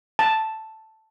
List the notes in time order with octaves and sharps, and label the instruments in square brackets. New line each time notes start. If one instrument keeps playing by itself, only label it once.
[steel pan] A5